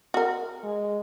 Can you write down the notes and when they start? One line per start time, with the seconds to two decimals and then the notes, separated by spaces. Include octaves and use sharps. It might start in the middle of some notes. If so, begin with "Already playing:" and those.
0.14 F#4 A#4
0.64 G#3